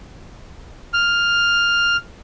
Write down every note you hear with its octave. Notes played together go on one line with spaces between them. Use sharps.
F6